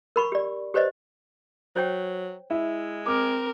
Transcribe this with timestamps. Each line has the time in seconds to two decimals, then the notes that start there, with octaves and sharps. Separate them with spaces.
0.16 A#4 B5 C#6
0.32 G4 D5
0.74 G4 B4 C5 D5 D#5
1.76 F#3 C5 C#5 G5
2.50 G#3 E4
3.06 C4 A#4 D6 F6